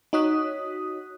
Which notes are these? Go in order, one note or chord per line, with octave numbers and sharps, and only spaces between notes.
D#4 F#4 C#5 D#6 F#6 B6